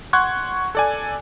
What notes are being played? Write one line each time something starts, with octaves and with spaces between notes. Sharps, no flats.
F#5 C6 C#6 F#6 G#6
A4 D5 G#5